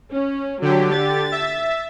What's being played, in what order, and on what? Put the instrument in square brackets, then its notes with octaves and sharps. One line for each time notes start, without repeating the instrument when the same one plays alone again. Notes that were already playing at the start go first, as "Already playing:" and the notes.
[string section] C#4
[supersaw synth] D3 G4 [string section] F#3
[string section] A6
[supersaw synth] E5